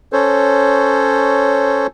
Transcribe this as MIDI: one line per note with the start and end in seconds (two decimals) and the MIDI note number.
0.13 1.87 61
0.13 1.87 69
0.13 1.87 72
0.13 1.87 73